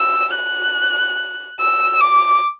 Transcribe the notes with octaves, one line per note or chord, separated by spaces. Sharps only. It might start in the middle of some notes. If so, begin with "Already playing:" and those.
Already playing: E6
F#6
E6
D6